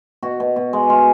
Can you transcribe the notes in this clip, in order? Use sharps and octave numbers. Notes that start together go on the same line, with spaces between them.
B2 F#4
B2
B2
G#3
G#3 F4